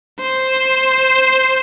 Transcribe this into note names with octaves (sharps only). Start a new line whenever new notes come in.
C5